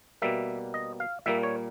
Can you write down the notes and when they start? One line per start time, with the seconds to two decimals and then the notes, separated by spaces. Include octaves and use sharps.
0.22 B2 G3 A#3 E5
0.74 D#5
1.00 F5
1.26 A#2 G3 A#3 E5
1.43 C#5